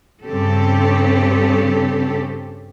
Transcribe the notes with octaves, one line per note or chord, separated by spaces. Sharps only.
G2 C#3 C4 C#4 G4 A4